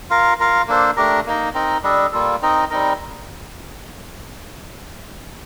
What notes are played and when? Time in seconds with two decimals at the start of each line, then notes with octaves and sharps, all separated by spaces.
0.10 F4 A#4 F5
0.40 F4 A#4 F5
0.68 A#3 D4 A4 C5
0.97 A3 D4 G4 A#4
1.27 A#3 D#4 A#4
1.55 C4 D#4 A#4
1.83 G3 D4 A4 D#5
2.12 G3 A#3 F4 A4
2.42 C4 D#4 A#4 D#5
2.70 G3 C4 D#4 A#4